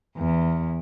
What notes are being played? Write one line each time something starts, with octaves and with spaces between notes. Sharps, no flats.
E2